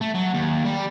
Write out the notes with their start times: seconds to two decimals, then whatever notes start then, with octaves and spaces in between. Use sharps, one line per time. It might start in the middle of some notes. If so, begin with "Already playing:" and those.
0.01 A3
0.15 F#3
0.34 D#2
0.65 G3